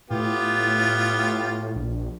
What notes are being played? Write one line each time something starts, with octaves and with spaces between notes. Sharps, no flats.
A2 B3 F4 G4
A#1